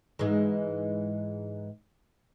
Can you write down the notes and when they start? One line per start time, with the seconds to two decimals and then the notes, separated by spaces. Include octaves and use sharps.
0.19 G#2 E3 G#3